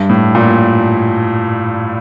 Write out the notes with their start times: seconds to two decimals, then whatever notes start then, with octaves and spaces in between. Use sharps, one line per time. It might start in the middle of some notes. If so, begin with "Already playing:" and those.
Already playing: G2
0.10 A2
0.35 A#2